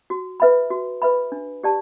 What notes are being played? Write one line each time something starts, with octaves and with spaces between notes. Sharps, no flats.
F#4
B4 E5 B5
F#4
B4 E5 B5
D4
G4 D5 A5